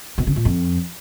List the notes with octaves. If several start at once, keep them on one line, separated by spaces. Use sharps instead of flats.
B2
C#3
A#2
F2